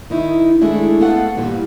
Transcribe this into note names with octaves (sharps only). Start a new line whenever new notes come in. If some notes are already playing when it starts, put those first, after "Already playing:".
D#3 D#4 E4
D#3 G#3 A3 D4 E4
G#3 A3 B3 A4 F5 F#5
G2 A#2 E3 G3